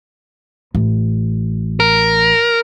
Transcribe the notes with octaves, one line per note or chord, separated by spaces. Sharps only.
A1
A#4